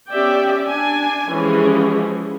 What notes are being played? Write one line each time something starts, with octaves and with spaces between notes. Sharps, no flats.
B3 C#4 G4 D5 E5 G5
D4 G#5
E3 F3 G#3 C#4 G4 G#4